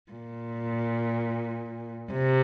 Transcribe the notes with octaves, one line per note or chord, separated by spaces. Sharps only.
A#2
C3